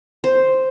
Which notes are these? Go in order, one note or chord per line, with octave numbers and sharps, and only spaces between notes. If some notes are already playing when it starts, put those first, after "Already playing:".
C5